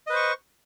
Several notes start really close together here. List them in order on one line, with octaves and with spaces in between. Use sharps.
D#5 B4 C5 C#6